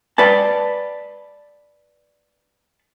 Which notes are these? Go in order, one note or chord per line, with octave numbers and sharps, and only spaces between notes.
B4 D5 A5